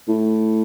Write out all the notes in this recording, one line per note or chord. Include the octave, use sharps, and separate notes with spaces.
A2